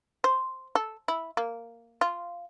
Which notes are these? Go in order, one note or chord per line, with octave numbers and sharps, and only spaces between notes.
C5
A4
E4
A#3
F4